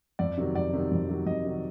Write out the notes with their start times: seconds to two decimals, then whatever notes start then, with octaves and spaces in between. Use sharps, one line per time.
0.19 F2 D5
0.37 C3 D#3 F#3
0.55 F2 D5
0.73 C3 D#3 F#3
0.91 F2
1.09 C3 D#3 F#3
1.26 F2 D#5
1.45 C3 D#3 F#3